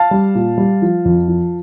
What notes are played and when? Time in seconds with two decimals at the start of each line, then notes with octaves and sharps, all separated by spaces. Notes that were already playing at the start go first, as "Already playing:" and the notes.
Already playing: F5 A5
0.11 G3
0.35 A#2
0.58 G3
0.82 F3
1.05 F2
1.28 F3